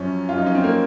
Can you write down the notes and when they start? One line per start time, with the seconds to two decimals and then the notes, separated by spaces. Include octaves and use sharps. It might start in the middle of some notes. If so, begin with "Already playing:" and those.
Already playing: F#2 F3 C#4
0.29 F4
0.33 F#2 F3 D#4
0.46 C#4
0.55 C4
0.64 A#3